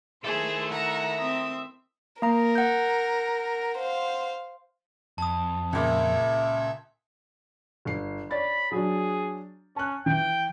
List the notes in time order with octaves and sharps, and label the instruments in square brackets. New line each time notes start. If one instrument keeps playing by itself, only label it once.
[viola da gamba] D#3 A3 E4 [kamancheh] G#4 [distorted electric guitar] A4 E5 [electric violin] C5
[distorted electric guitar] E5 [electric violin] F#5 [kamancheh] A#5
[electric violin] C4 D#6
[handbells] A#3 A#5 [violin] A#4
[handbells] F#5 G6
[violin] C5 F5
[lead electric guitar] F2 [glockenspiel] A5 D#6
[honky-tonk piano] C#2 A#2 [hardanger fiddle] E5
[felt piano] G1 C7
[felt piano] C#5 D5 A6 [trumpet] B5
[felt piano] F#3 D4 [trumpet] G#4
[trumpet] C#4 [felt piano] A5 F#6
[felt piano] E3 [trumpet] G5